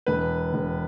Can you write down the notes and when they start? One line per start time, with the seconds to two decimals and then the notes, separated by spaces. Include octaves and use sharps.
0.06 E1 B4
0.53 E1